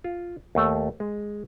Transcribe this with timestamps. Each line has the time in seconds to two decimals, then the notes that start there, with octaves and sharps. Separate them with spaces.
0.04 F4
0.55 D#2 A3
1.00 G#3